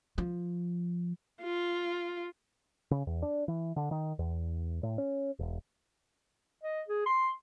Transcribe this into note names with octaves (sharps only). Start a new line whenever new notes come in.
F3
F4
C#3
E2
D4
E3
D3
D#3
E2
A2
C#4
E1
D#5
G#4
C6